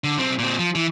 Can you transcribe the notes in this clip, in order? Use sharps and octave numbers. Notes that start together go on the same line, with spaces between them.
D3
B1 C4
A#2 C4
F3
E3